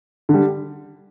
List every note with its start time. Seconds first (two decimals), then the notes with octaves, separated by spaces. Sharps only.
0.29 D3
0.34 G3